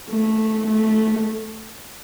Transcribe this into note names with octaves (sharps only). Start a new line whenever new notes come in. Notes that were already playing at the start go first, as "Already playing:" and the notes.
A3
A3